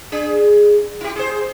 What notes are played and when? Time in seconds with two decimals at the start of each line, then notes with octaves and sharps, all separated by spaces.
0.12 D4 G#4
1.01 E4 G4
1.16 G#4 C5